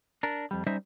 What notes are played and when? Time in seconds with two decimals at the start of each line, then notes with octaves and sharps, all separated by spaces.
0.23 D4 A#4
0.51 F2 G3
0.66 G3 C#4 D#4 C5 D#5 E5